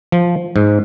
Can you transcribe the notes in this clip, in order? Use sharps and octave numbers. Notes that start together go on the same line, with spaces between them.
F3
G#2